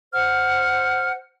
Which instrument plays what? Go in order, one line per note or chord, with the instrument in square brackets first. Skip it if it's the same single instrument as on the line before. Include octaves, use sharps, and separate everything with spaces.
[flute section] C5 F#5 F6